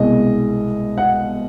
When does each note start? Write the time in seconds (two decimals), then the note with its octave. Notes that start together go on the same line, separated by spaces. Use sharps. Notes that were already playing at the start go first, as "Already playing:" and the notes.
Already playing: C2 B2 G#3 D#5
0.98 F#5